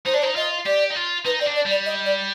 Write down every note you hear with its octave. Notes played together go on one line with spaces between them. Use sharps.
D#4 C5
D4 D5
D#4 C5
F4 D#5
G4 D5
D#4
F4
D#4 B4
C4 D5
D4
D5
G3 D5
D#5
D5